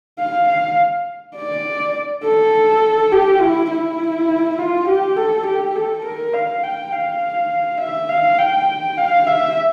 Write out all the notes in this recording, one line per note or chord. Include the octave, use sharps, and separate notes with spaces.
F5
F5
D5
A4
G4
E4
E4
F4
G4
A4
G4
A4
A#4
F5
G5
F5
E5
F5
G5
F5
E5